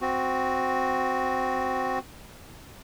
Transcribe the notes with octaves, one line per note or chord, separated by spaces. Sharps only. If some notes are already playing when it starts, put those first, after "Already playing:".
C4 F#4